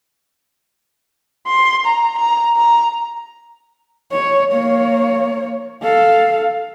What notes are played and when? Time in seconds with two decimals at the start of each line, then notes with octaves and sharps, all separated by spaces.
1.48 C6
1.86 A#5
2.19 A#5
2.57 A#5
4.11 C#5
4.51 A#3 C#5
5.82 A4 F5